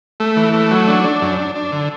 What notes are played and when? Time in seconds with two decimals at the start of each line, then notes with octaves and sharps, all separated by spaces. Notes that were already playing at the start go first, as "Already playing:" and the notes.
0.20 A3
0.37 E3
0.53 A3
0.71 F#3
0.88 D4
1.04 D4
1.22 F#2
1.38 D4
1.55 D4
1.72 D3